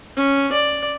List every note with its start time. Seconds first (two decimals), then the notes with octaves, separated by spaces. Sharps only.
0.16 C#4
0.52 D5